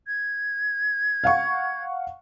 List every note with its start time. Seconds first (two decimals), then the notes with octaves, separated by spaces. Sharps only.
0.07 G#6
1.24 F5 F#5 C#6